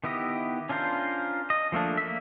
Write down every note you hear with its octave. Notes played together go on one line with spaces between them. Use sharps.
D#3 B3 E4 G4 D#5
C#4 D4 F4 A#4 C5
D#5
F3 A3 A#3 D4
A#3 E5